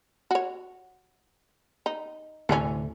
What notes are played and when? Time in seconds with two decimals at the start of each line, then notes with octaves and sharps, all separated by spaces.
0.31 F#4 C#5
1.86 D#4
2.49 D2 A2 C3 E3 A3 C#4